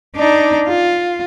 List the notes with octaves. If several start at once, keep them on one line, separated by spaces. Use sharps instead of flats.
D4 D#4
F4